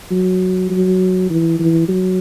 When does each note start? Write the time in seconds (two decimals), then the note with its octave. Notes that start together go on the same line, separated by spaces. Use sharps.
0.11 F#3
0.70 F#3
1.30 E3
1.59 E3
1.89 F#3